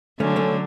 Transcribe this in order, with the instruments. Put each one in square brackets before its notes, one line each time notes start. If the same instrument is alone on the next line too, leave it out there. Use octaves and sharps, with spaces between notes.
[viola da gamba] D3 F#3 [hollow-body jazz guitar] A3 C#4
[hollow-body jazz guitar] A3 C#4